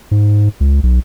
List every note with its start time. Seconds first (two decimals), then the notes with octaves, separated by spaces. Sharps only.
0.11 G#2
0.60 C#2
0.83 B1